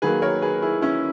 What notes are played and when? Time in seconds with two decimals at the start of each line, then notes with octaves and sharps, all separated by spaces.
0.02 D#3 F#3 A#3 G#4 B4
0.22 A#4 C#5
0.42 G#4 B4
0.62 E4 G#4
0.82 C#4 E4